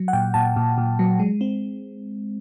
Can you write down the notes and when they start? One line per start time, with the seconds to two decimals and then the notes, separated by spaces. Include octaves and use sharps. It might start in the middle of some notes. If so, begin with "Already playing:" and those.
Already playing: F#3
0.08 F#5
0.13 A#2 G5
0.34 A#2 A5
0.56 A#2
0.78 A#2
0.99 F#3
1.19 G#3
1.41 C4